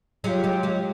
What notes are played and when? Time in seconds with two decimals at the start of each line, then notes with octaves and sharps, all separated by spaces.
0.24 F#3 G#3 F4 G4
0.44 F#3 G#3
0.63 F#3 G#3